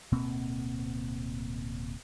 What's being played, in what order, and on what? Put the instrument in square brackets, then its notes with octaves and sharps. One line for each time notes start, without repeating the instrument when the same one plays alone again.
[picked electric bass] D1 B2 A#3 C4